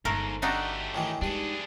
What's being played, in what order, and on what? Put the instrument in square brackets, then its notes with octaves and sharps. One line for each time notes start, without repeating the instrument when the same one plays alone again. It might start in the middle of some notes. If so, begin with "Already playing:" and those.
[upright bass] G1 [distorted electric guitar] G#2 [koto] A3 A#4
[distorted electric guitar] A3 G4 [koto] D4 D#4 F#4 [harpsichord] E5
[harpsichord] A2 D#3 E3
[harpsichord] G2 C6 [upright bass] G#3 D#4 [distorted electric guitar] D4 G#4